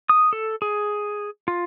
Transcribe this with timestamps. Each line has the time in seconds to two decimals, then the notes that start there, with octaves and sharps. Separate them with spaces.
0.09 D#6
0.33 A4
0.62 G#4
1.48 F4